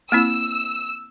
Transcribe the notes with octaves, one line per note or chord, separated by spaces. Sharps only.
A#3 C4 E4 E6